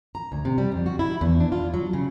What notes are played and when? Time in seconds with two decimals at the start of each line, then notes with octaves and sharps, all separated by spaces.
0.15 A#5
0.32 D2
0.45 C3
0.58 G3
0.72 F2
0.86 F#4
0.99 E4
1.21 E2
1.40 D4
1.52 F4
1.74 F#3
1.93 C#3